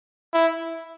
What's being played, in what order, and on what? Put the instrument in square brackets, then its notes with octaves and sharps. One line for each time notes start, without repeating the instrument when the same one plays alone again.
[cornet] E4